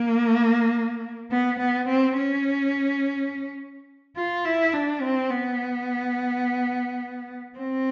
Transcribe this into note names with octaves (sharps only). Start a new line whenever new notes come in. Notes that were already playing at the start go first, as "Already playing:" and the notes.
Already playing: A#3
B3
B3
C4
C#4
F4
E4
D4
C4
B3
C4